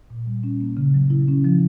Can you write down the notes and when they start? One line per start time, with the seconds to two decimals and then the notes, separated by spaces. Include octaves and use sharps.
0.10 A#2
0.26 G3
0.44 C#4
0.61 A#3
0.77 C#3
0.94 F#3
1.10 E4
1.28 C#4
1.45 F3